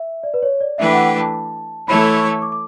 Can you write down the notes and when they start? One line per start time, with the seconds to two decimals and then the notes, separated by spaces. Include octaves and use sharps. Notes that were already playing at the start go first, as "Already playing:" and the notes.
Already playing: E5
0.23 D5
0.34 B4
0.42 C#5
0.61 D5
0.78 E3 A3 D4 G4 B4 E5
0.93 F#5
1.06 G5
1.20 A5
1.88 E3 A3 E4 A4 C#5 B5
2.05 B5
2.15 C#6
2.42 D6
2.52 D6